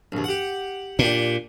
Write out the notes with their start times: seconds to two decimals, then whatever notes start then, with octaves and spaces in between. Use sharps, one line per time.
0.12 A#1 D#2
0.24 G4 F#5
0.99 A#2 D4 G4